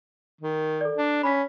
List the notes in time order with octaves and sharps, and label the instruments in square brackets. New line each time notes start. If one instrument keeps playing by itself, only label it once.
[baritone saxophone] D#3
[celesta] A4 D5
[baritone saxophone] D4
[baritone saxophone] C#4 [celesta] B5 B6